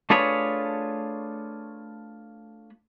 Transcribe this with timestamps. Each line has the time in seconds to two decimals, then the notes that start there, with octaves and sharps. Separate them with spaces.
0.10 A3 D4 F4 G#4 B4 C#5